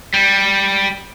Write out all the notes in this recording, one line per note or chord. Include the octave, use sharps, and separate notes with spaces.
G3